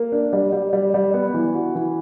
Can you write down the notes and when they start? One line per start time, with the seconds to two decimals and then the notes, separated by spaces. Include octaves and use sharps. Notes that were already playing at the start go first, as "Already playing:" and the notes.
Already playing: A#3
0.12 D4
0.33 G3
0.52 G3
0.73 G3
0.94 G3
1.14 B3
1.34 E3
1.55 F#4
1.75 E3